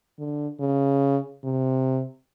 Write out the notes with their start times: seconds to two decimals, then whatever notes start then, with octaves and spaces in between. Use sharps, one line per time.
0.19 D3
0.60 C#3
1.44 C3